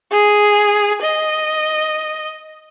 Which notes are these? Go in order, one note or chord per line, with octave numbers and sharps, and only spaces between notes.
G#4
D#5